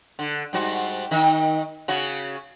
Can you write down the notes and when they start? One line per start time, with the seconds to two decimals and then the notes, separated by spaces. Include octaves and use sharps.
0.19 D3
0.53 G#2 G3 F#4
1.11 D#3 D#4
1.88 C#3 C#4 F#4